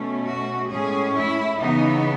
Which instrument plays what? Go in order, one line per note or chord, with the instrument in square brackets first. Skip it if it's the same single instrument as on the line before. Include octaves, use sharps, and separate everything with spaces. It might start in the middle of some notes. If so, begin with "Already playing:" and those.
Already playing: [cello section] B2 A3 C#4
F#4
A2 G#3 C#4 G#4
E4
C#3 E3 B3 D#4